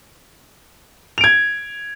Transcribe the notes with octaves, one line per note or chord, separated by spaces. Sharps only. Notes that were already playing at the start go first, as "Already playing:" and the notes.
G#6 D7 F7